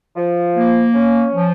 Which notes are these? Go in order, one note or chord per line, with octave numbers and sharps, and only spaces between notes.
F3
A#3
C#4
F3